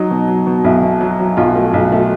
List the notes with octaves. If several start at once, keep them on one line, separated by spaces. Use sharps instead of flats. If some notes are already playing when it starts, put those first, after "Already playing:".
Already playing: F#3 D#4
B2
F#3
B2
B1 E4
B2
F#3
F#3
B1 F4
A3
B1
A3